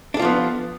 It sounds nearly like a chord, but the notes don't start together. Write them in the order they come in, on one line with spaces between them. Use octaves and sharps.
D4 A4 F4 F3 B3